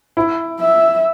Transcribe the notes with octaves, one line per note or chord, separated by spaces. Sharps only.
E4
E5